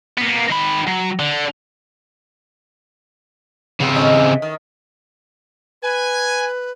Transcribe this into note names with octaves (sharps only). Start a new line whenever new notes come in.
A#3 B3
D#3 B5
F#3
D3
C#3 B3 C4
A2 C#4 D#5
C3 E3
D#3
B4 G#5